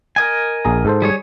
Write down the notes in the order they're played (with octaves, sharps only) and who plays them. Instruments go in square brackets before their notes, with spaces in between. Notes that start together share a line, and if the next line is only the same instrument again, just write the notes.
[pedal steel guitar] A#4 D#5 G#5
[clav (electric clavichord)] A#1 G#4 A#5
G#2 A4 C5
[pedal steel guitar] G3 G#4 C#5